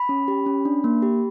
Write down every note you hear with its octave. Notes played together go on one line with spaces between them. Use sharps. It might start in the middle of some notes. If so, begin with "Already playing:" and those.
Already playing: B5
C#4
G4
C#4
D4
A#3
G4